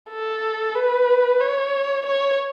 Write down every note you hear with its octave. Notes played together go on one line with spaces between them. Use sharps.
A4
B4
C#5
C#5